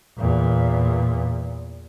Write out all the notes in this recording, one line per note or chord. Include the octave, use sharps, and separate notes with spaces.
E2 A#2